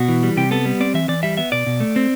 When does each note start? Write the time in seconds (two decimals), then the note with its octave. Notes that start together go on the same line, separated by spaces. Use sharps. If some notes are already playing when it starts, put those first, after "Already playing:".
Already playing: B2 F#4
0.08 E3
0.23 G3
0.37 C3 G4
0.51 B3 A4
0.65 G3
0.80 C4 D5
0.94 E3 E5
1.08 E3 D5
1.23 G3 E5
1.37 B3 E5
1.52 B2 D5
1.67 B2
1.80 A3
1.96 C4